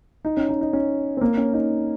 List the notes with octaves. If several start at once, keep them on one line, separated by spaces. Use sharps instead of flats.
D#4
C#4
D#4
D#4
C#4
C4
A#3
C#4
D#4